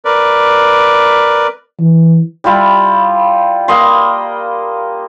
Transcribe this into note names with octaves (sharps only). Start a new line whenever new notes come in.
A#4 B4 D5
E3
G3 E4 F4 B5
A#3 D#5 B5 C6